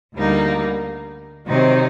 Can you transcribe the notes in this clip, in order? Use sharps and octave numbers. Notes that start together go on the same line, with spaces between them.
D2 D3 G3 A#3 D#4
C3 D#3 F#3 C4 D#4